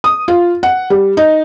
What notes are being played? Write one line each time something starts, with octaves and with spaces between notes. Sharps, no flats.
D#6
F4
F#5
G3
D#4